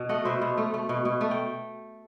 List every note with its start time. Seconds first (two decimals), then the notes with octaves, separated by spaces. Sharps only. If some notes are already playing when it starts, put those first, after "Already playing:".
Already playing: B2
0.09 A3 D#5 F#5
0.25 B2 C5 E5
0.42 B2
0.57 A3
0.74 A3
0.89 B2
1.05 B2
1.21 A3
1.31 G5